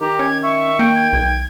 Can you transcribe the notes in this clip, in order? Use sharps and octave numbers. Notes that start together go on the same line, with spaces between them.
D#3 G4 A#5
C#4 G#6
E5 C#6
A#3 G5
G#6
B1 G#6